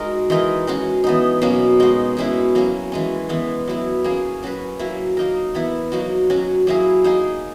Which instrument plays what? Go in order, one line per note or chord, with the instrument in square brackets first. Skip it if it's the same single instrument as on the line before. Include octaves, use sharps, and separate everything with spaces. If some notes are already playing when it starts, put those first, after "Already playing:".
Already playing: [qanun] G#3 D#4 F#4 A#4
E3 G#3 D#4 A#4
G#3 C#4 F#4
E3 B3 D#4
B2 F#3 A#3 C#4
G#3 D#4 F#4
B2 G#3 C#4 E4
F#3 A#3 C#4
E3 G#3 C#4
E3 G#3 B3
F#3 B3 E4
A#3 C#4 G#4
F#3 C#4 F#4 B4
F#3 A#3 E4
A#3 D#4 A#4
E3 B3 E4
F#3 A#3 D#4 F#4
F#3 C#4 F#4
F#3 A#3 E4 G#4
A#3 D#4 G#4